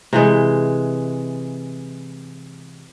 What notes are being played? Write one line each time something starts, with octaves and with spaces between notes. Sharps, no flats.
C3 E3 G#3